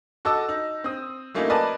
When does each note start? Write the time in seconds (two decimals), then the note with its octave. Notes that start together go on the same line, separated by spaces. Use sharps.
0.25 F#4 A4 D#5 D6 E6
0.49 D#4
0.84 C4 D#6
1.34 F#3 A3 A#3 C#4 D#4 E4
1.50 A#4 B4 D5 D#5 G#5 A5